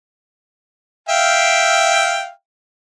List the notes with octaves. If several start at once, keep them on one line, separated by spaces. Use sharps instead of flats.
E5 F5 G5